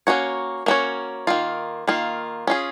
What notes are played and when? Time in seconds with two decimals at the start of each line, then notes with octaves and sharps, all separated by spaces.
0.07 A#3 C#4 F#4 C#5
0.66 A#3 C#4 F#4 C#5
1.27 D#3 A#3 F4
1.87 D#3 A#3 F4
2.47 C#4 F4 G#4